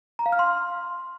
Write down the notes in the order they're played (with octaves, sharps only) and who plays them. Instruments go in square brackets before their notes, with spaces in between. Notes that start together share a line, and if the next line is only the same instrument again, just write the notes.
[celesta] A#5
F5
F6
C6